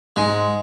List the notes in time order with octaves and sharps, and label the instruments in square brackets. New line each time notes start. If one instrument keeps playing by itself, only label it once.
[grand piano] G#2 [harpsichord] G#3